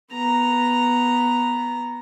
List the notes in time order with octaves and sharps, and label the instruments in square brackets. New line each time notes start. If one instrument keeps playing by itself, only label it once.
[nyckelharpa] B3 A#5